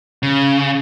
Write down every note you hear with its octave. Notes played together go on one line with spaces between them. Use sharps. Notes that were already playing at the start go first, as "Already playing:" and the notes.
C#3